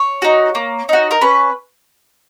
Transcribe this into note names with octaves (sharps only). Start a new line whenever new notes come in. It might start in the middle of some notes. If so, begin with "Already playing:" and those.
Already playing: C#5
D#4 F#4
A#3
D#4 F#4
A#4
C#4 B4